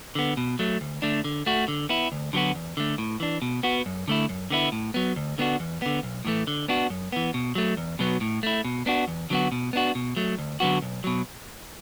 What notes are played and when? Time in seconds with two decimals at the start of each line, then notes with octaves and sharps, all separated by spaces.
0.15 D3 B3
0.37 B2
0.59 F#3 A3
0.81 D2
1.02 D3 A3 D4
1.24 D3
1.46 A3 F#4
1.68 D3
1.89 B3 E4
2.12 D2
2.33 D3 F#3 B3 F#4
2.55 E2
2.77 D3 A3
2.98 A2
3.20 E3 D4
3.42 B2
3.63 B3 F#4
3.86 F#2
4.08 D3 A3 E4
4.29 F#2
4.50 D3 B3 E4
4.72 A2
4.94 F#3 B3
5.16 D2
5.38 D3 B3 D4 F#4
5.60 E2
5.82 D3 B3
6.03 B1
6.25 A2 E3 A3
6.47 D3
6.68 B3 D4 F#4
6.90 F#2
7.12 E3 B3
7.34 B2
7.55 F#3 A3
7.77 E2
7.99 B2 F#3 B3
8.21 A2
8.43 A3 E4
8.65 B2
8.86 B3 D4 F#4
9.08 E2
9.30 D3 F#3 B3 F#4
9.52 B2
9.73 B3 D4 F#4
9.95 B2
10.17 F#3 A3
10.39 D2
10.60 D3 F#3 B3 F#4
10.82 B1
11.04 B2 F#3